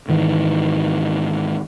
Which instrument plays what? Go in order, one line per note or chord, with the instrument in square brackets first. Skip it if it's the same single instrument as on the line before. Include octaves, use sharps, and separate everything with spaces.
[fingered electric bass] G#2 D#3 E3